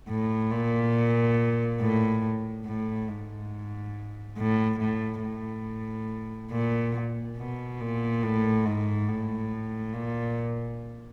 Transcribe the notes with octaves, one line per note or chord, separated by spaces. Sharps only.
A2
A#2
A2
A2
G#2
A2
A2
A2
A#2
B2
A#2
A2
G#2
A2
A#2